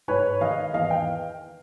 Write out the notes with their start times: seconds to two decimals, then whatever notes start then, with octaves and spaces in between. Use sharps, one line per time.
0.08 G#2 B4 C#5
0.41 D#3 D#5 F5
0.74 E2 D#5 F5
0.90 F5 G5